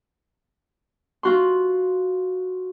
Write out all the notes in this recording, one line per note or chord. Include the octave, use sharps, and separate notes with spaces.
F4 F#4 C6